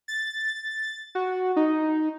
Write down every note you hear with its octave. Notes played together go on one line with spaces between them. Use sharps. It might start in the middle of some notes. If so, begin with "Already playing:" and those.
A6
F#4
D#4